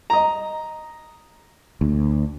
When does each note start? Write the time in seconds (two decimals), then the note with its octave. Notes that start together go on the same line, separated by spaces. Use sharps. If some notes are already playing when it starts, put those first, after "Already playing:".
0.10 D#5 A#5
1.81 D2